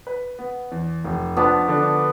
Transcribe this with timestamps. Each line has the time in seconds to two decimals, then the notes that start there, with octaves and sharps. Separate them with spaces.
0.07 B4
0.39 B3
0.71 E2
1.04 F1
1.37 F3 B3 D4
1.69 D3